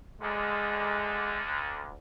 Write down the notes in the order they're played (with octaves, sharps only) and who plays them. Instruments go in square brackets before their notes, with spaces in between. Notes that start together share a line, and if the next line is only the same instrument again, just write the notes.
[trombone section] D2 D3 [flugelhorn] G#3